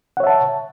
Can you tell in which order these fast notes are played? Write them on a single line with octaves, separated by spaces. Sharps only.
F#5 C#5 E5 A5